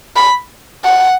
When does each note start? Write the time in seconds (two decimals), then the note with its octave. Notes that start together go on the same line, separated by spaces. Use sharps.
0.16 B5
0.84 F#5